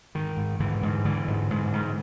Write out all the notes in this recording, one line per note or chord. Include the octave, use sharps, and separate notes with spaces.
G#2 D#3
G#2
G#2 D3 E3
G#2
G#2 D3 E3
G#2
G#2
G#2